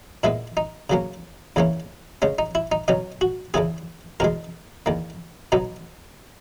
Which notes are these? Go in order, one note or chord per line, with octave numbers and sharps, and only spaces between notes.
A#2 G#3 B3 E4
D#4
C#3 F#3 A#3 C#4
E2 C#3 E3 A#3 C#4
C#3 G#3 C#4
D#4
E4
D#4
B2 F#3 C#4 D#4
F#4
E2 C#3 E3 B3 G#4
E2 B2 G#3 A#4
E2 D#3 A#3
B2 F#3 B3 D#4